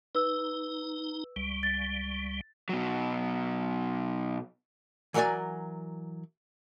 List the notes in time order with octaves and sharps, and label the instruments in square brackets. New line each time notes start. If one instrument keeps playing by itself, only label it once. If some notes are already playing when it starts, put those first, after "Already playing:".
[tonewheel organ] D#4 [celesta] B4 E6
[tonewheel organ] C#2 G3
[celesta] A6
[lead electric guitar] B2 F#3
[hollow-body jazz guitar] E3 F#3 A#4 C#5 D5 G#5